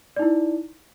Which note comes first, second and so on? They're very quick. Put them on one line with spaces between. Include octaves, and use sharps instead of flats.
D5 D#4 E4